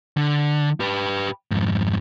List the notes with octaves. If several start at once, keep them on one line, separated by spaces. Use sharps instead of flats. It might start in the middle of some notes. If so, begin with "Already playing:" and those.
D3
G4 B4
F2 G#2